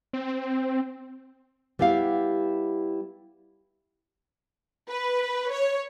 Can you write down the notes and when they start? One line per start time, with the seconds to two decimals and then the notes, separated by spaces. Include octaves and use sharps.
0.13 C4
1.79 G3 B3 E4 G4 F5
4.88 B4
5.52 C#5